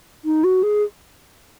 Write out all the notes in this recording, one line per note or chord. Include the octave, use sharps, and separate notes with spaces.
D#4
F#4
G#4